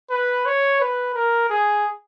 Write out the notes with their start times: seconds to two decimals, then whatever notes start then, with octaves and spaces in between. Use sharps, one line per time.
0.10 B4
0.45 C#5
0.80 B4
1.15 A#4
1.49 G#4